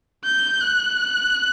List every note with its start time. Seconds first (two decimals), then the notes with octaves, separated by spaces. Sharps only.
0.25 G6
0.61 F#6